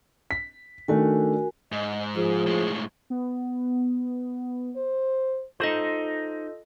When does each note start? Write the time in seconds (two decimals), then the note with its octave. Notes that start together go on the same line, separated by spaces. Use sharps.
0.31 B6
0.88 D#3 A3 D4 F#4 A#4 G#5
1.72 G#2 D#5
2.16 F3 G#4
2.47 A2 G#3
3.10 B3
4.76 C5
5.60 D#4 F4 A4 C5 D#5